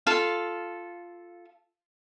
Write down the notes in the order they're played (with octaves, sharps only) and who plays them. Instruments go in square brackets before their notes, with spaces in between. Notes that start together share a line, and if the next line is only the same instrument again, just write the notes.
[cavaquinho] F4 A4 F5